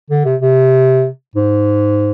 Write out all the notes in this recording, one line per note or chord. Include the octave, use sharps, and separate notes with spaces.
D3
C3
C3
G#2